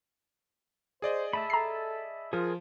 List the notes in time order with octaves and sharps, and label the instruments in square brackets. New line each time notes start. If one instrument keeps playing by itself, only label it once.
[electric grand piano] G#4 D5 D#5 [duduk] C5
[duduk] A3 [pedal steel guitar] E5 A5 B5
[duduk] A4 [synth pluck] A#5 C7
[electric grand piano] F3 [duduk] F4 [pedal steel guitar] G#4 A#4